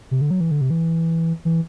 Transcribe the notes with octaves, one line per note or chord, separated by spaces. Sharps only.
C3
D3
F#3
E3
D3
C3
E3
E3